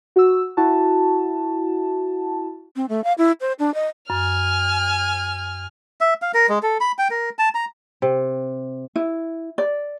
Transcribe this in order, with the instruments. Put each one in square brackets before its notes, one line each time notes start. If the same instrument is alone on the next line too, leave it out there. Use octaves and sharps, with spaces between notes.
[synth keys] F#4 E6
E4 F#4 A5
[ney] C4
A3
F5
E4
C5
D4
D#5
[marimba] F#2 [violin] G#5 F6
[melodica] E5
F5
A#4
G#3
A4
B5
G5
A#4
A5
A#5
[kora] C3
[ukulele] E4
D5